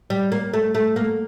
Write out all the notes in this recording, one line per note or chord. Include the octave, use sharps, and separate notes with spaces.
G3
A#3
A3
A3
A#3